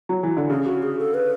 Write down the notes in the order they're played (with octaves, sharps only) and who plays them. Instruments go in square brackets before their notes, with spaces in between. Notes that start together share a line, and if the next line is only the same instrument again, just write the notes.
[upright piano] F#3
E3
D3
[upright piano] C#3 [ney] G#4
[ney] F#4
G#4
A4
B4